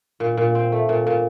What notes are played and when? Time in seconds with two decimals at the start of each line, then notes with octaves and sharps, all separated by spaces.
0.20 A#2
0.37 A#2
0.55 C4
0.72 A3
0.89 A#2
1.07 A#2